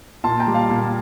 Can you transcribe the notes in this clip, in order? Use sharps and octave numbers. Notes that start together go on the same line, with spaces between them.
A#2 A5 C6
G5 A#5
G3
F5 A5
A#2